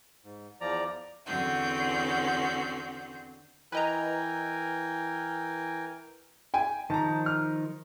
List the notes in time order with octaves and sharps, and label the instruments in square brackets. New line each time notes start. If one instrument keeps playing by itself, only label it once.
[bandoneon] G#2
E2 F3 D5 A#5
[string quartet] E2 D3 C4 C#4 F#4 G6
[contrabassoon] E3 [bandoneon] A#4 G5 G#5 [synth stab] B4 D#5 A#5
[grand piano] G5 G#5
[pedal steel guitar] D#3 F3 D#4 [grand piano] A5 A#5
[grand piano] F6